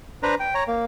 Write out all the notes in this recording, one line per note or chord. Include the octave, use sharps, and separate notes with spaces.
D4 B4 C5 A#5
G5
C#5 A#5
A#3